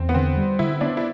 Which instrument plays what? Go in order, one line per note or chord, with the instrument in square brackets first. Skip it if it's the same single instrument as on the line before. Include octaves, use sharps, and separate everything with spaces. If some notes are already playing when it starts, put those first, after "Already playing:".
Already playing: [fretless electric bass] E2 [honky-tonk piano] C4
[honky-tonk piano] B3
[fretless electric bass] D3 [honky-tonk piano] C4
[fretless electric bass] G3
[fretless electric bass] D3 [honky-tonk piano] E4
[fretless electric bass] B3 [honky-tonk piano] D4
[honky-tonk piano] E4